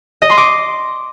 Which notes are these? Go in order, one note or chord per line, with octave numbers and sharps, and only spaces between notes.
D#5
C6
D6